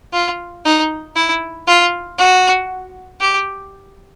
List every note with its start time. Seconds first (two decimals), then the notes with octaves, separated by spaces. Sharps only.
0.13 F4
0.65 D#4
1.16 E4
1.67 F4
2.18 F#4
3.20 G4